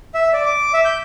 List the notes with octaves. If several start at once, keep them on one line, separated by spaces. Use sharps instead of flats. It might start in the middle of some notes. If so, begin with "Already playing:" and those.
E5
D5
D6
E5
G6